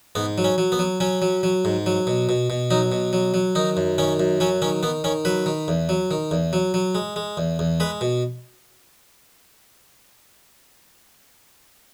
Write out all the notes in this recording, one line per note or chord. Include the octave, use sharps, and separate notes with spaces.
G#2 B3
F#3
C#4
F#3
B3
F#3
F#3 C#4
F#3
F#3
G#2
F#3
B2
B2
B2
F#3 D#4
B2
F#3
F#3
D#3 D#4
F#2
D#3 C#4
F#2
F#3 C#4
D#3 C#4
D#3 B3
D#3 C#4
F#3 B4
D#3
E2
F#3
D#3
E2
F#3
F#3
G#3
G#3
E2
E2
G#3 B4
B2